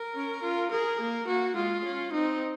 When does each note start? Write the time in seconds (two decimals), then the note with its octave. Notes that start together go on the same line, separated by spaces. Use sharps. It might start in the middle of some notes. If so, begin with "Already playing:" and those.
Already playing: A#4
0.15 C#4
0.43 F4
0.71 G#4 A#4
0.99 A#3
1.27 A#3 F#4
1.56 G#3 F4
1.84 C#4
2.13 C4 D#4